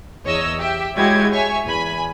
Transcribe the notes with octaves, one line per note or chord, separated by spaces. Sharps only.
E2 C#5 D#5 E6
G4 E5
G#3 E4 F#4 G4 C#5 G#6
C#5 E5 G#5 C#6
E2 G#5 B5